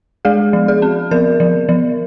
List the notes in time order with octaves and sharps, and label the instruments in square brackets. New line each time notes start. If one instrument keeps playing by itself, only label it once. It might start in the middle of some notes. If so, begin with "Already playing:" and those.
[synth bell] G#3 G#4
F3
G#4
C4
F3 A#4
F3
F3